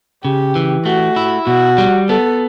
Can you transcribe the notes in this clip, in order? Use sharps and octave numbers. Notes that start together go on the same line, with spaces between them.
C#3 G4
E3
A3 F#4
E4
B2 F#4
G3
B3 A4